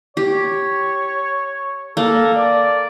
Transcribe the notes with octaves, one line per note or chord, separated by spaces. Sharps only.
G4 C#5
A#3 A4
D5